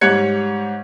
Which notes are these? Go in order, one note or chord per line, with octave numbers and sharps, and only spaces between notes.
G#2 G3 C#5 F#6 G#6 C#7